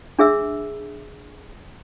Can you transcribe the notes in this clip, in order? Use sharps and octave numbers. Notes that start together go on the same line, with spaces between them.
D4 G#4 E5 E6